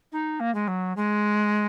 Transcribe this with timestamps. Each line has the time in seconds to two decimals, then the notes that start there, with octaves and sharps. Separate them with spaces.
0.12 D#4
0.40 A#3
0.55 G#3
0.68 F#3
0.96 G#3